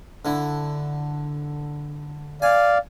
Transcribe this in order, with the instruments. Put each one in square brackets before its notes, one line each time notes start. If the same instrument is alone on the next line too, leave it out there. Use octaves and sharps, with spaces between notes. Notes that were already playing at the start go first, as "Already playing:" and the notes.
[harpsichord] D3 E4
[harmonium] D5 F5 [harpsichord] G#5